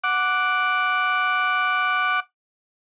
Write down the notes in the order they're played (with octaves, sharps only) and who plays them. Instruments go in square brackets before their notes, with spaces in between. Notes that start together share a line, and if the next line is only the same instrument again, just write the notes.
[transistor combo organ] F#5 D6